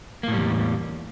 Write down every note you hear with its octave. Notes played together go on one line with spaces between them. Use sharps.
E2 A2 G3 A#3